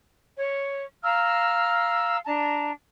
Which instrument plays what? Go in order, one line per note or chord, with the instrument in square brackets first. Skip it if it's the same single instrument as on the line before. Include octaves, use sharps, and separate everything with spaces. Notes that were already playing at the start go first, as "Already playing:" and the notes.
[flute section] C#5
F5 A#5 E6 F6
D4 A5 A#5